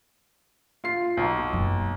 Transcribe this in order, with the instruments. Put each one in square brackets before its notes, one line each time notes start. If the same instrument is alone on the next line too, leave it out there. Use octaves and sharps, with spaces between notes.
[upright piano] F4 C7
B1
[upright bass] F#1